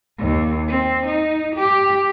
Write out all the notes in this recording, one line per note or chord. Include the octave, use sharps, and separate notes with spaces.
D#2
C4
D#4
G4